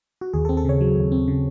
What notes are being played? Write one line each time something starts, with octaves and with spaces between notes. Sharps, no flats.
F#4
D#2 G#4
A4
C4
A4
C#3 C#5
F#3
D#2
C4
C#3